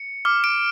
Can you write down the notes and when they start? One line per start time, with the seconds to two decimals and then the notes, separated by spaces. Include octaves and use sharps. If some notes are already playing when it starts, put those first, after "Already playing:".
Already playing: C#7
0.25 D6 F6
0.44 D7